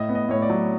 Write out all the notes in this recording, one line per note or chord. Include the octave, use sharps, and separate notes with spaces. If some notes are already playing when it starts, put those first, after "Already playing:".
Already playing: A2 D#5
B3
D#5
A2 C#5
D5
F#3